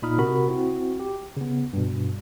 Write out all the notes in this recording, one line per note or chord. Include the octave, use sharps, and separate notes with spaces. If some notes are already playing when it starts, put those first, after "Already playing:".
A#2 D#4 B5 D#6 F6
C3 F#4 A#4 B5
C4 E4 F#4
G4
C#3 B3
G2 B2